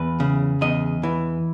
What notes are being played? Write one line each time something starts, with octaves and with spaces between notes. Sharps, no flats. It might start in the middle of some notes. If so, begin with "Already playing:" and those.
Already playing: E2 B4
C#3
E2 D#5
E3